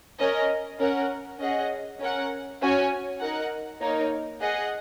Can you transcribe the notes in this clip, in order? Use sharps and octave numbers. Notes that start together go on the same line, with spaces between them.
C#4 A#4 D#5
C#4 A#4 F#5
C#4 G#4 D#5 F#5
C#4 A#4 F#5
C#4 F#4 C#5 G#5
D#4 A#4 F#5
A#3 D#4 A#4 C#5
G#4 D#5 F#5